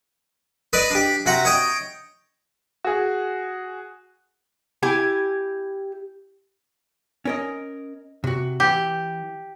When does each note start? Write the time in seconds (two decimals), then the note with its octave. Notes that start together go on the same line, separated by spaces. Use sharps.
0.73 B4 D5 D#5
0.91 D4 G4
1.26 C3 F#4 F#5 A#5
1.45 C#5 D#5 G5
2.84 F#4 G#4
4.83 E4 G4 G#5
7.25 C#4 A#4 D#5
8.24 C3 F#4
8.60 E3 G4